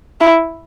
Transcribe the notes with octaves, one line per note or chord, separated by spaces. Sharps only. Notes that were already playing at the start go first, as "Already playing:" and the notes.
E4